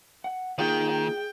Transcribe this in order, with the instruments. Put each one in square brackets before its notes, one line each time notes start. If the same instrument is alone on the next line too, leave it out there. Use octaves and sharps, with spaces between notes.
[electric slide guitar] F#5
[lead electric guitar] D#3 [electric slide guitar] A#3 D#4 F4 [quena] G#4 [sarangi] G5
[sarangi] G5